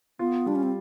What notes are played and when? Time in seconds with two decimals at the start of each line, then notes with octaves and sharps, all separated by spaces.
0.19 B3 F4
0.46 G3 D4
0.55 C#4
0.63 C4